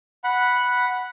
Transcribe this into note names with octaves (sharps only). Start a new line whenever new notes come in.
F#5 B5